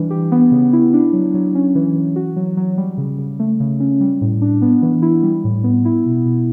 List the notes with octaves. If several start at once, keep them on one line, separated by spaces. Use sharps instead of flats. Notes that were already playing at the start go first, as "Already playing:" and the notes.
Already playing: E3 G3 D4
G4
B3
C#3
E4
D4
F#3
F#3
C#4
E3
E3
F#4
F#3
F#3
G3
C#3
C#3
A3
C#3
C#4
G3
A2
D4
B3
E3
E4
G3
A2
B3
E4
B2
B2